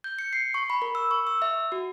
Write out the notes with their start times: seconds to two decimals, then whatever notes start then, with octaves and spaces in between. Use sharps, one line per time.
0.04 G6
0.19 C#7
0.33 C7
0.54 C#6
0.70 B5
0.82 A#4
0.95 E6
1.11 C#6
1.27 E6
1.42 E5
1.72 F#4